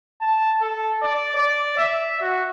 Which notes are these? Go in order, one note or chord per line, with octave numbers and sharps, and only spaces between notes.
A5
A4
D5
D5
E5
F#4